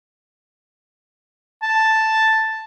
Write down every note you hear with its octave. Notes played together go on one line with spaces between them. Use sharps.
A5